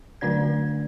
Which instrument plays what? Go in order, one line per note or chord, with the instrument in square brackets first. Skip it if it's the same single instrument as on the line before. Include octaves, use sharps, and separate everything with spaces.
[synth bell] D3 A3 D4 D5 G#6